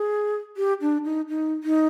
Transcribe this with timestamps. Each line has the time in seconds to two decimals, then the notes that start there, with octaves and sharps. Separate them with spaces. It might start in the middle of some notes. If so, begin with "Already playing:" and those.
Already playing: G#4
0.57 G4
0.81 D4
1.05 D#4
1.29 D#4
1.64 D#4